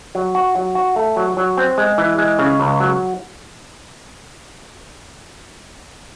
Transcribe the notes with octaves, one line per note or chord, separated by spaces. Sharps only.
F#3
F#4
F#3
F#4
A3
F#3
F#3
C4
G#3
E3
G#3
C#3
C#2
F#3